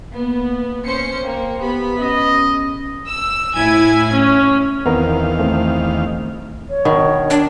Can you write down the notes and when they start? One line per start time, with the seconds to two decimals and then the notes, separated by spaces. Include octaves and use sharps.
0.13 A#3 B3
0.85 C#4 C5 C#7
1.24 A#3 G5
1.60 B3 G4 B5
2.00 C#4 D#5
3.08 E6
3.55 A2 E4 G#5 G#6
4.12 C#4
4.86 E2 D#3 B3 C4 A#4 F5
5.40 A3 C4
6.69 C#5
6.85 B2 D#3
7.30 D4